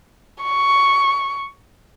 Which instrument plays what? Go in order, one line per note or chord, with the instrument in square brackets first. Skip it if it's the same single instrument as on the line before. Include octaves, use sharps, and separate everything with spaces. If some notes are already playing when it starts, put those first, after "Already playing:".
[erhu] C#6